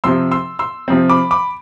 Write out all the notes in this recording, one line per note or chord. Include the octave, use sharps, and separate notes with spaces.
C3 F3 C4 C6 E6
C6 E6
C6 E6
C3 F3 C4
B5 D6
B5 D6